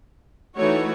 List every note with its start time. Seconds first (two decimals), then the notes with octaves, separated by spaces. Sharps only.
0.57 E3 A3 D#4 F#4 C#5